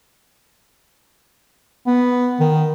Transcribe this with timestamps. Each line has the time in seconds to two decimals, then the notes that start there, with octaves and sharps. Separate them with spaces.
1.87 B3
2.40 D#3